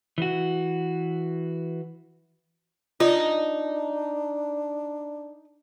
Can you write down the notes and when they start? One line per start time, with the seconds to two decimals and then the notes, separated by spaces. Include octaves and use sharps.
0.18 E3 F#4
3.00 D4 D#4 F4